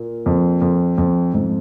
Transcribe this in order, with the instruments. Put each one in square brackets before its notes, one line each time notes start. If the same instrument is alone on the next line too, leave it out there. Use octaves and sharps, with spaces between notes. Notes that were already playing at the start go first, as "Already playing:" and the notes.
Already playing: [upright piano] A#2
[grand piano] F2
F2
F2
[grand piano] F2 [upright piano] G#2